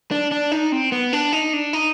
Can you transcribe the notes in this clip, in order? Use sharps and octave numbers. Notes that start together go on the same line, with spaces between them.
D4
D4
D#4
C4
B3
D4
D#4
D4
D#4